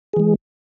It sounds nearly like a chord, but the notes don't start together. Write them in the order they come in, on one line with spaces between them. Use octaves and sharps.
G#4 E3 G#3